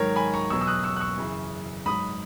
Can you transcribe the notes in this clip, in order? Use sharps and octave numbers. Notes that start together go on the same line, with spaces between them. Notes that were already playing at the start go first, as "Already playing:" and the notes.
Already playing: G#2 D#3 F#3 A#4 C#5
G#5 B5
A#5 C#6
E2 B2 F#3 C#6 E6
E6
D#6 F#6
C#6 E6
F#6
C#6 E6
F#2 C#3 E3
G#2 F#3 B5 D#6